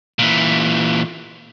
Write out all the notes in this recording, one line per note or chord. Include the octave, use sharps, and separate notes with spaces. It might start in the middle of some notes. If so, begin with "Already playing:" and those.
A#2 E3